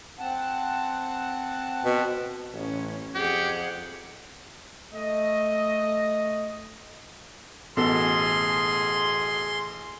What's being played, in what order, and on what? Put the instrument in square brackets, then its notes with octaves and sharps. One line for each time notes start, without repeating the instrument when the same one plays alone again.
[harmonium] C4 F#5 A5
[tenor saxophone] B2
[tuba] A1 [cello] C#4
[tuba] F2 [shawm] G4 [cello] G#4 F#5
[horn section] A3 D#5
[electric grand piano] A1 A4 [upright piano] B2 [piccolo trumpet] G#4 [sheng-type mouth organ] C6